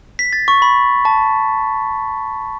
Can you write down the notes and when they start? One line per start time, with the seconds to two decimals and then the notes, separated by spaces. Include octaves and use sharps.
0.19 B6
0.33 A6
0.48 C#6
0.62 B5
1.05 A5